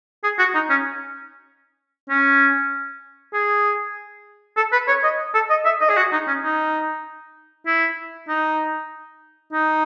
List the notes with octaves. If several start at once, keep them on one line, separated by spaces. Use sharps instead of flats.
G#4
F#4
D#4
C#4
C#4
G#4
A4
B4
C#5
D#5
A4
D#5
E5
D#5
G#4
F#4
D#4
C#4
D#4
E4
D#4
D#4